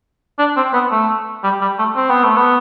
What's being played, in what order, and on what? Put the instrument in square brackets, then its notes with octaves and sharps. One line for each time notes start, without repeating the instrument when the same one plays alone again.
[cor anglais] D4
C4
B3
A3
G3
G3
A3
C4
B3
A3
B3